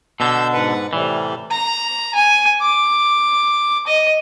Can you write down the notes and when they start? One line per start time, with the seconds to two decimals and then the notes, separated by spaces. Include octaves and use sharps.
0.20 B2 D3 E6 G6
0.53 G#2 B4 F#5
0.93 A2 C3 E3 G3
1.51 A#5
2.15 G#5
2.62 D6
3.87 D#5